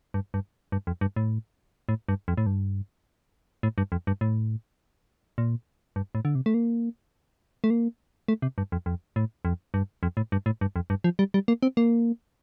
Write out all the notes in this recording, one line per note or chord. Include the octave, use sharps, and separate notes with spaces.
G2
G2
G2
F2
G2
A2
A2
G2
F2
A2
G2
A2
G2
F2
G2
A2
A#2
G2
A2
D3
C3
A3
A#3
A3
A#3
A3
C3
G2
F2
F2
A2
F2
G2
F2
A2
G2
A2
G2
F2
G2
F3
G3
G3
A#3
C4
A#3